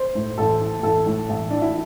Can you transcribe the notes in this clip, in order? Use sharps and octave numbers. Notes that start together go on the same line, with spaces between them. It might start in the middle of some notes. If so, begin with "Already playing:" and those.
Already playing: C5
A2
A1 A4
E3
A1 A4
A2
A1
E3 D4
E4